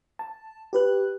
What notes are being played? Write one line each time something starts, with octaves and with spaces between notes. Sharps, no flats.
A5
G4 B4 F#6